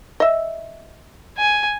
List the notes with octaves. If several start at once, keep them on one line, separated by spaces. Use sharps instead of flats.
D#5 E5
G#5